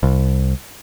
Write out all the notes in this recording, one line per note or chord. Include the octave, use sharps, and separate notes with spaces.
C2